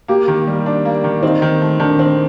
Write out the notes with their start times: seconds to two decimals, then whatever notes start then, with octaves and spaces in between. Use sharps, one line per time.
0.08 A#3 G4
0.28 D#3
0.47 G3
0.66 D4
0.85 A#3
1.04 D#3
1.22 C4 D#4
1.42 D#3
1.61 A3
1.80 D#3 D4
1.99 C4